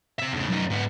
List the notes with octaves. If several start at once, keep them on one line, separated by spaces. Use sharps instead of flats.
C4 E5
E2 C#3
F#2 D#4
G#2 B3